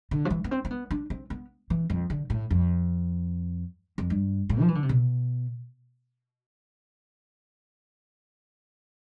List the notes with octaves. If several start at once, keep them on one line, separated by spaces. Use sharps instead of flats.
D3
F3
E3
B3
C4
C4
B3
D4
C4
B3
E3
F2
D3
A2
F2
F2
G2
A2
F3
E3
D3
C3
B2